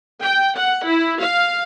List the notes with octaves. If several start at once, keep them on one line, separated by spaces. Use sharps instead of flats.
G5
F#5
E4
F5